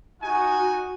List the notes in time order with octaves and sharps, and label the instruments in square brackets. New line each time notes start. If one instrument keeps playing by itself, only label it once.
[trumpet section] D#4 G#5 [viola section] F#4